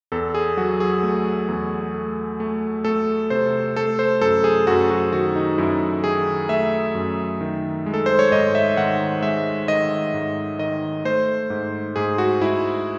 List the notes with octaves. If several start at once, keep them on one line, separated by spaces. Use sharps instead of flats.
E2 A4
G#4
F#3 F#4
G#4
A3
E2
A3
A3
A3 A4
C3 C5
A3 A4
C5
F#2 A4
G#4
F#2 F#4
F#4
D#3 F#4
D#4
F#2 E4
D#3 G#4
A3 E5
F#2
D#3
G#3
A4
C5
C#5
G#2 D#5
E5
D#3 F#5
G#3 E5
D#3 D#5
G#2
D#3 D#5
A3 C5
G#2
G#2 G#4
F#4
G#2 E4